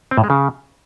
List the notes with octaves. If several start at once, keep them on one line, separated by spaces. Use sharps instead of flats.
C4
A2
G#3
C#3